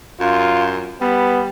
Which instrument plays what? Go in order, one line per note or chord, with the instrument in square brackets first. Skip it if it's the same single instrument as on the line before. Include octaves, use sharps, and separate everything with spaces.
[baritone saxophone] F#2 [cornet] F4
[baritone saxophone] G3 [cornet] B3